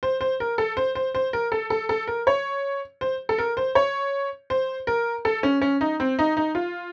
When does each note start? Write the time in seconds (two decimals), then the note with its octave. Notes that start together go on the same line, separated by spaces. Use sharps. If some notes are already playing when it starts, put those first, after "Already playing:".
0.03 C5
0.21 C5
0.40 A#4
0.58 A4
0.77 C5
0.95 C5
1.15 C5
1.33 A#4
1.52 A4
1.70 A4
1.89 A4
2.07 A#4
2.27 C#5
3.01 C5
3.29 A4
3.38 A#4
3.57 C5
3.75 C#5
4.50 C5
4.87 A#4
5.25 A4
5.43 C#4
5.62 C#4
5.81 D#4
6.00 C4
6.19 D#4
6.37 D#4
6.55 F4